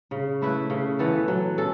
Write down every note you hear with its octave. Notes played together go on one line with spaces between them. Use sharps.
C#3
A3 E4 B4
C#3
E3 B3 A4
F#3
C#4 A4